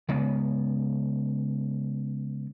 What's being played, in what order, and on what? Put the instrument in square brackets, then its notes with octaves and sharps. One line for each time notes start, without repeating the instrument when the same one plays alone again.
[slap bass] C#3 G#3 B3